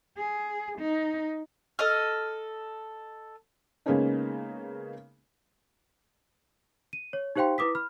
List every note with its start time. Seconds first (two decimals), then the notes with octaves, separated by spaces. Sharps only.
0.18 G#4
0.79 D#4
1.79 A4 D#5 F6
3.86 C#3 G#3 A#3 B3 C#4 D#4
6.93 D#7
7.13 C#5
7.36 D#4 G4 C5 F5 G5 C6
7.58 E4 B4 D6 D#6 B6
7.75 B5 F6